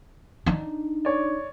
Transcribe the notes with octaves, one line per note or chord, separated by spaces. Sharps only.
D4 D#4
C#5 D5